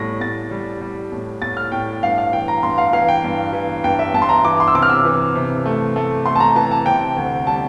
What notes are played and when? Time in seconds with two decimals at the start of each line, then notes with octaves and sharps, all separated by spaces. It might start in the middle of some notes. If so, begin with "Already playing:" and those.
Already playing: A2 G3 A#6
0.21 A2 A6
0.51 G3
0.81 G3
1.12 A2
1.42 A2 A6
1.57 F6
1.72 A2 G5
2.03 G2 F5
2.18 F5
2.32 E3 G5
2.48 A#5
2.63 G2 C6
2.78 F5
2.93 E3 F5
3.08 G5
3.24 G2
3.53 E3
3.84 G2 G5
3.99 E5
4.14 G2 A5
4.22 C6
4.29 A#5
4.44 E3 D6
4.60 C6
4.68 E6
4.75 C3 D6
4.82 F6
4.90 E6
5.05 E3
5.36 C3
5.66 A3
5.96 A3
6.26 A3 C6
6.36 A5
6.40 A#5
6.56 E3 A5
6.71 A5
6.86 C3 G5
7.17 D2
7.47 G3 A5